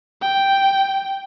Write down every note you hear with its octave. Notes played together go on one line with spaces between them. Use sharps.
G5